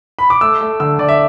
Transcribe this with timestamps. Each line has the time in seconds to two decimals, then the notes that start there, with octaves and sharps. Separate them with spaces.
0.19 B5
0.30 D6
0.41 A3 E6
0.61 A3
0.80 D3 E6
0.99 D3 D5
1.09 E5